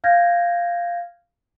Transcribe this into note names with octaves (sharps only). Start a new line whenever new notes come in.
F5 F6 G6 G#6 A#6